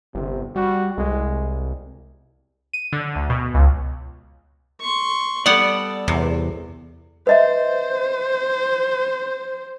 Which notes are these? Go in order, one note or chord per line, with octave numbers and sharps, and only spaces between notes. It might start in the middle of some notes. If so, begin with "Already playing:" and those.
G1 C3
G3 F#4
C2 G#3
D#7
D3
D2
B2
C#2
C6 C#6
G3 B3 A4 D5 F#5
E2 C3
B4 C5 D#5 E5